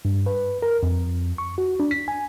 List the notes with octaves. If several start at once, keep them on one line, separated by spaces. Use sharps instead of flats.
G2
B4
A#4
F2
C#6
F#4
D4
B6
G#5